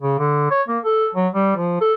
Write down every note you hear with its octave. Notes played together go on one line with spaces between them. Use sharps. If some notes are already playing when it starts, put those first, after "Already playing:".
C#3
D3
C#5
A#3
A4
F#3
G3
F3
A4